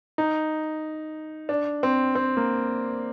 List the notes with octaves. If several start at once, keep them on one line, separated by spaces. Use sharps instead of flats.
D#4
D4
C4
C4
A#3